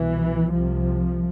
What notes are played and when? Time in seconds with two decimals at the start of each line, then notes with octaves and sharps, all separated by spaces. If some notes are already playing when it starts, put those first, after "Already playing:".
Already playing: C2 B2 E3
0.51 C2 C3 F3